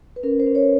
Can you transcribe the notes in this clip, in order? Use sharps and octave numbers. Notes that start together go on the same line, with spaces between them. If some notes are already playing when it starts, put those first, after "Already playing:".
B4
C#4 A#4
C5
C#4
C#5